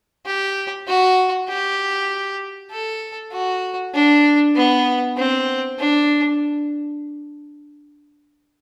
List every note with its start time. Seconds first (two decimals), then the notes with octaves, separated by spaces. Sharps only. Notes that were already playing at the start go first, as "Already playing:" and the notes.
0.26 G4
0.87 F#4
1.48 G4
2.71 A4
3.32 F#4
3.95 D4
4.56 B3
5.17 C4
5.79 D4